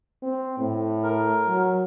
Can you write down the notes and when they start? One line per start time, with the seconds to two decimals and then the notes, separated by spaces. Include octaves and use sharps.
0.22 C4
0.58 A2
1.04 A#4
1.48 F#3